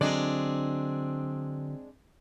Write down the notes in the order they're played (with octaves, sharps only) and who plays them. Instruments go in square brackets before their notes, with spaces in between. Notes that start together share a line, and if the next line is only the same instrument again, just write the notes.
[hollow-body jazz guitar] D3 F#3 [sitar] G#3 D4 D5 [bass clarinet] C4